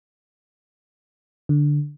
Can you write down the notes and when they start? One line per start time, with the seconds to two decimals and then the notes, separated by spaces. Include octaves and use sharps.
1.49 D3